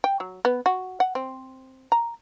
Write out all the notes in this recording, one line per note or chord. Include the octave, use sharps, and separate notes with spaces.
G5
F#3
B3
F#4
F#5
C4
A#5